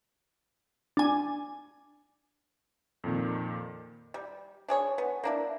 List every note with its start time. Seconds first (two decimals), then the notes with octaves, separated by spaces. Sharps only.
0.97 D4 G#5
3.04 F2 A#2 D#3
4.14 G3
4.68 D4 G#4 C#5
4.98 B3
5.24 A#3 D4 E4